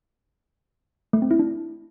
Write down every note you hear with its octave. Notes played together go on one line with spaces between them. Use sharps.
A3
C4
E4
D4